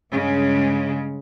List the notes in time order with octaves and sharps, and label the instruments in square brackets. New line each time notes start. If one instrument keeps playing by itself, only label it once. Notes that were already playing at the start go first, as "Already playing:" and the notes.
[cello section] G2 C#3 G#3